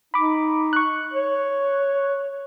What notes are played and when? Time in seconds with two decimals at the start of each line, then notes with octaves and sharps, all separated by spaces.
0.14 D#4 B5 D6
0.73 C#6 F#6
1.14 C#5